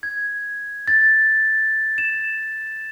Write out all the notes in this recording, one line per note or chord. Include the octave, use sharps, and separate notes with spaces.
G#6
A6
E7